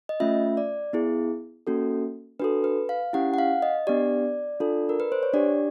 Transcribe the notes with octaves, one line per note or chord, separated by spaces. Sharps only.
D#5
A3 C#4 F4 E5
D5
B3 E4 G#4
A#3 C#4 F#4 A4
D4 F#4 A4 B4
B4
F5
C#4 E4 G4 F#5
F#5
F5
D#5
B3 D4 G4 D5
D4 F4 A4
A#4
B4
C5
C#5
D4 G4 D5